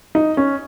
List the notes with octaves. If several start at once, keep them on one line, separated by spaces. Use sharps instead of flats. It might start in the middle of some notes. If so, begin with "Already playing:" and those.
D#4
C#4